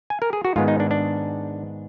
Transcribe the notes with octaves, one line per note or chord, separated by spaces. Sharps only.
G#5
A#4
G#4
F#4
G#2 D#3 G#3 B3 F4
D#4
D4
D4